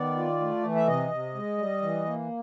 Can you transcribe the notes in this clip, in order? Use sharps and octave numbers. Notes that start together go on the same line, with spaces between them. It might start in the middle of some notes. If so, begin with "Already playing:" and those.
Already playing: D#3 B3 D5
F4
A3
E3
E5
C3 D#5
C3
G#3
G3
E3
A#3